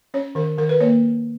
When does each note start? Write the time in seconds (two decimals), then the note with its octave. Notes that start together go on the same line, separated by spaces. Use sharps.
0.14 C#4 C#5
0.35 D#3 A#4
0.57 D#3 A#4
0.69 B4
0.80 A#3 C#5